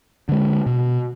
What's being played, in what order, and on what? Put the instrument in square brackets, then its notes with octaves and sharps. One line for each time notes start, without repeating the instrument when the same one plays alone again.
[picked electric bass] D3 G#3
B2